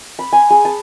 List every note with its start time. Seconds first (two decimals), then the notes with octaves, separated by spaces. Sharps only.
0.19 B5
0.33 G#5
0.50 G#4
0.65 A5